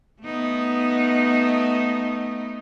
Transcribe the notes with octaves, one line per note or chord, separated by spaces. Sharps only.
A3 B3 D#4